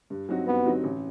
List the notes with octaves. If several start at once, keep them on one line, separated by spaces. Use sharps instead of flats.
G2
F#3 C4 D#4 F#4
G2 B3
F#3 C4 D#4 F#4
A1